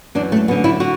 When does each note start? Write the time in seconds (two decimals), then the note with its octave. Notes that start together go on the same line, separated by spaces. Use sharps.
0.15 F#2 E3 D4
0.32 A3
0.48 F#2 B3
0.51 D3
0.64 E4
0.80 D3 F#4